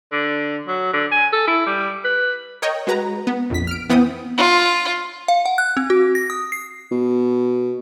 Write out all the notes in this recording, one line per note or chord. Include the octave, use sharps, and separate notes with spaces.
D3
F#3
D3
G#5
A4
E4
G3
B4
A#4 C#5 D#5 G5
G#3 F#4 B4 A#5
B3
A#1 F2 B6
F6 D7
E3 B3 C4 G5 D#6
F4
F5
F#5
F#6
C4
F#4
A#6
D#6
C7
B2